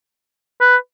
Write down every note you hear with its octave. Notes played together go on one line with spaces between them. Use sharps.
B4